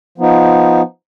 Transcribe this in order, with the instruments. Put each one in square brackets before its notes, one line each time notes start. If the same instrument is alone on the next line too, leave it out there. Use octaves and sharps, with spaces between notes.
[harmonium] F3 B3 D#4